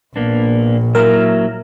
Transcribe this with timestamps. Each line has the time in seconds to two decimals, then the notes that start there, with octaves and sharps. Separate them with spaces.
0.16 A#1 A#3 B3 D4
0.95 F#3 A#3 E4 A#4